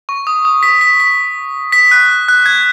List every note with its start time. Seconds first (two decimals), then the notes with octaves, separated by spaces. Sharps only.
0.09 C#6
0.27 D#6
0.45 D#6
0.63 B6
0.81 B6
1.00 B6
1.72 B6
1.91 F#6
2.29 F#6
2.46 G#6